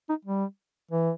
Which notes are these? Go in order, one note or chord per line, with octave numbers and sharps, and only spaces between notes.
D#4
G3
E3